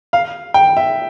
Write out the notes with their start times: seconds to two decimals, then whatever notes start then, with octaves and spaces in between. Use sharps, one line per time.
0.13 F5
0.54 G5
0.77 E5